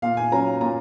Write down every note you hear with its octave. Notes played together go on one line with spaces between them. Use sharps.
A#2 F5
G#5
F#3 C#4 A#5
A#2 A#5